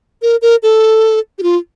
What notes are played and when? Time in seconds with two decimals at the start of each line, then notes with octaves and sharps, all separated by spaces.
0.22 A#4
0.42 A#4
0.63 A4
1.38 G4
1.43 F4